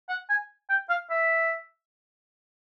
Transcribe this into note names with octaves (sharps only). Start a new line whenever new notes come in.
F#5
G#5
G5
F5
E5